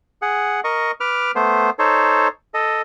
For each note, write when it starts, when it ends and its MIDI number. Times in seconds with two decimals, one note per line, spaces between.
0.22 0.60 68
0.22 0.60 78
0.64 0.91 70
0.64 0.91 75
0.64 0.91 85
1.00 1.31 71
1.00 1.31 86
1.00 1.31 89
1.35 1.70 57
1.35 1.70 59
1.35 1.70 72
1.79 2.28 63
1.79 2.28 69
1.79 2.28 72
1.79 2.28 73
2.54 2.82 69
2.54 2.82 75